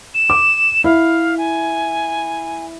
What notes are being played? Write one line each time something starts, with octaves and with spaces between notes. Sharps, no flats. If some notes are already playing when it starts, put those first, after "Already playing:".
E7
D6
E4 F5
G#5